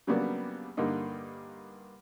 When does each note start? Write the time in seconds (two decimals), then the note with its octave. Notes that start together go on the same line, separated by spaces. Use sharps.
0.07 C#3 F#3 G3 A#3 B3 D4
0.77 G2 D3 A#3 D#4